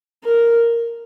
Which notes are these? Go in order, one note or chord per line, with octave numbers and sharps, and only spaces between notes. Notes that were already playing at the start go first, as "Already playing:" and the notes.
A#4